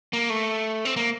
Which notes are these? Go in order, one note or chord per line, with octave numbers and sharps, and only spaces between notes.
A#3
A3
C4
A#3